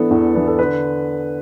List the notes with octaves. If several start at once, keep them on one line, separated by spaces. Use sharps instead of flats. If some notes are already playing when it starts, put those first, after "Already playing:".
Already playing: E3 B3 D4 A4
E2
E3 B3 D4
A4
D3 B4